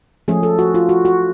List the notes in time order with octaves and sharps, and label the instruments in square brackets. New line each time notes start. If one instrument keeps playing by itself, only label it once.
[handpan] F3 A3 C#4 G#4
A4
F#4
F4
F#4
F#4